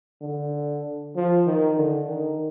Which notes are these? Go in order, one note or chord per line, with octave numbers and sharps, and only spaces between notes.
D3
F3
D#3
D3
D#3